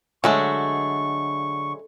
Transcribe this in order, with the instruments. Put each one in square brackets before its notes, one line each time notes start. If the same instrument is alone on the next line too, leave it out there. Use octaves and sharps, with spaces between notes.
[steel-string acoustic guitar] D3 [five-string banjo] F#3 G#3 A3 [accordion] C#6